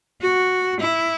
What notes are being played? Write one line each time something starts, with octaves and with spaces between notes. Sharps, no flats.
F#4
E4